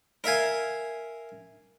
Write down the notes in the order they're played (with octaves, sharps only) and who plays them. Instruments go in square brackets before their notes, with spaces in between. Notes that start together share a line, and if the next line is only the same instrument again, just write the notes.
[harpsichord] A#4 E5 F5 G#5